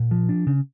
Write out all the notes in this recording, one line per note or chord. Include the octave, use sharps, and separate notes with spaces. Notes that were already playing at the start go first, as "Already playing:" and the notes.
Already playing: A#2
F3
D4
C#3